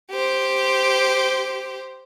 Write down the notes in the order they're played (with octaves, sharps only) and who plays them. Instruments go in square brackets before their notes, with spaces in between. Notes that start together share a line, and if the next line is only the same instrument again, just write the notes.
[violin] G4 C5